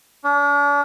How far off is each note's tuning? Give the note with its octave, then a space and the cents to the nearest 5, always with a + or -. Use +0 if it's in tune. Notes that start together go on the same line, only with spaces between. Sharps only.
D4 -40